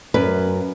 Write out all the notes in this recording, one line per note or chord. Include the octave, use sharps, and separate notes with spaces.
F#2 B4